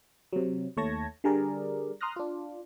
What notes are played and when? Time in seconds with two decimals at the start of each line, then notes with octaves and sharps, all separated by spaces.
0.33 C3 F#3
0.77 D#2 A3 C#5 A5 G#6 A#6
1.24 D3 G3 G#4 A#4 D5
2.01 A#5 C6 D#6 F6 F#6 A#6
2.16 D4 F4